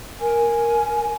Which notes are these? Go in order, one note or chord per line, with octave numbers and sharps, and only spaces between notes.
A#4 G#5